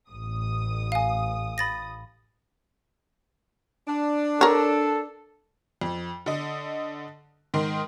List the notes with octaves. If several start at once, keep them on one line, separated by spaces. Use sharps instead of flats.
A1 D#6
F5 G#5
B5 A6 A#6
D4
A4 A#4 C#5
F2
D3 D#5
G#2 D#3 A#4 D#5 C6